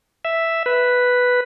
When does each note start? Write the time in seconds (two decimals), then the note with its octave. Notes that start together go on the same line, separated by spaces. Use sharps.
0.25 E5
0.66 B4